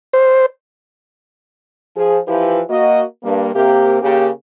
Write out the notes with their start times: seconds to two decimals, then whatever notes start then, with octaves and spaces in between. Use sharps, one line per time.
0.13 C5
1.97 F3 G#4
2.27 E3 F3 E4 F4 G4 B4
2.70 A#3 F#4 D#5
3.23 G2 A#3
3.54 C3 A#3 G4
4.02 C#3 A#3 G4